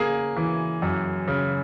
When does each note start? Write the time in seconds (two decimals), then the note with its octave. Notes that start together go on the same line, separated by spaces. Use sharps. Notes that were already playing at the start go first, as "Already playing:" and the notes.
Already playing: C#3 A#3 G#4
0.36 E3
0.82 F#2
1.28 C#3